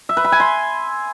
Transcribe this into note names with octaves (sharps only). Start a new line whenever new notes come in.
E5
B4
B5
G#5
C6